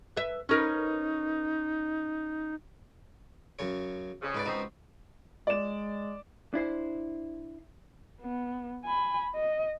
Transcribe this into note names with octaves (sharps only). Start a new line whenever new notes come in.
B4 E5
C#4 D#4 A#4 B4
F#2 C#3 C#5
F2 C#3
G#2 B4 D5
C#2 B2 B3 C4 D#4
G#3 D5 E7
D4 E4 C5
B3
G#5 B5
D#5